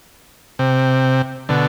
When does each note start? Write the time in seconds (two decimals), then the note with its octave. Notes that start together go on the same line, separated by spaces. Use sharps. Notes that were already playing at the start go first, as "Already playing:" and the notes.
0.59 C3
1.49 B2 D3